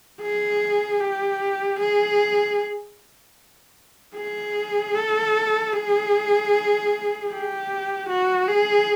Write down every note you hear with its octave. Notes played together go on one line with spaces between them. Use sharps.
G#4
G4
G#4
G#4
A4
G#4
G4
F#4
G#4